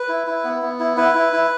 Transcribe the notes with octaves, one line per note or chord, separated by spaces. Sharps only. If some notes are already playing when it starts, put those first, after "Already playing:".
Already playing: B4
E4
E4
B3
B3
E4
E4 B4
E4
E4